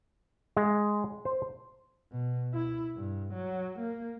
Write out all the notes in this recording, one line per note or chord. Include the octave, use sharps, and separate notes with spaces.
G#3
C5
B2
E4
G2
F#3
A#3